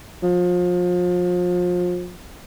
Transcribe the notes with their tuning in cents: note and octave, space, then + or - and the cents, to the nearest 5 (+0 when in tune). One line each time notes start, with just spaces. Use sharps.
F3 +30